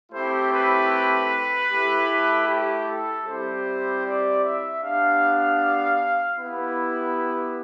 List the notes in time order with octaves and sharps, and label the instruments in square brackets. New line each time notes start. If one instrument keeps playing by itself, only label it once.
[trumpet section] A3 C4 E4 G4 C5
B4
A3 E4 G4
G4
A4
G3 C4 E4 G4 C5
D5
E5
B3 D4 G4 F5
B3 E4 G4